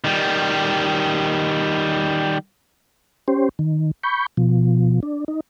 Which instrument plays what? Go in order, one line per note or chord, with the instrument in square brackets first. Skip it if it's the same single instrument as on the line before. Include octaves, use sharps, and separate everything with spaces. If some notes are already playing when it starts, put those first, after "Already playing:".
[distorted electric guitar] D#3 G3
[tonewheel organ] C#4 G4 C5
D#3
B5 C#6 G6
B2 F3
D4
D#4